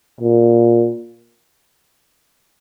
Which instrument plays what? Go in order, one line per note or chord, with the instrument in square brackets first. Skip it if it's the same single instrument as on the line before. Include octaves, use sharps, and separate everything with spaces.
[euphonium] A#2